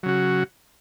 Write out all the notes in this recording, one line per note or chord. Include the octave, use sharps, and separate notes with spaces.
C#3 F#3 F#4